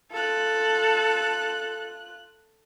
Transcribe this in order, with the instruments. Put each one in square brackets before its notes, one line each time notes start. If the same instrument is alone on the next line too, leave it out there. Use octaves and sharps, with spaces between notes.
[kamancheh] F4 F#6 [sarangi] A4